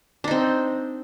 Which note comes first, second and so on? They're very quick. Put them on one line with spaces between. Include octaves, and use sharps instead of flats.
D4 D#4 C4